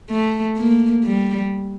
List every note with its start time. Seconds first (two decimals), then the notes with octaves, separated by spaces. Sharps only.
0.10 A3
0.57 A#3
1.04 G3